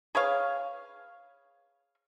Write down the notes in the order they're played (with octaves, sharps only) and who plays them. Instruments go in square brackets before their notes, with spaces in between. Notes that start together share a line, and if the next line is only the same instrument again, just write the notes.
[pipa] G#4 B4 C#5 F5